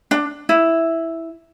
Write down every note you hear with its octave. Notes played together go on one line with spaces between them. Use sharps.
D4
E4